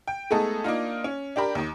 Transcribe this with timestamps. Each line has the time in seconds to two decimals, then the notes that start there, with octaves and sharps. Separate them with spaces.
0.08 G5
0.30 G#3 A3 B3 D#4 G#4 A4
0.64 A#3 D4 D#4 F4
1.04 C#4
1.36 D4 G4 A#4 B5
1.55 D#2 D#3